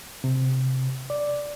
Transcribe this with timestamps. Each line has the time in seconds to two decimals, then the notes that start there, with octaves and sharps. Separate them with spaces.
0.24 C3
1.10 D5